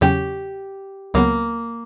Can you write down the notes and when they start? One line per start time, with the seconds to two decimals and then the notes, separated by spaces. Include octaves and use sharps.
0.01 E2 C#3 F#3 C#4 G4
1.14 C#2 C#3 F#3 A#3 B3